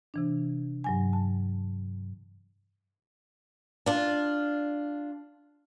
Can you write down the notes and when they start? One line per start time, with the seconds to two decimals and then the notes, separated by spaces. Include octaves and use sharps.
0.14 C3 E3 D4
0.84 G2 F#3 G#5
1.13 A5
3.86 D4 F4